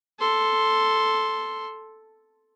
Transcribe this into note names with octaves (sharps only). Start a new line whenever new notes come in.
A4 C6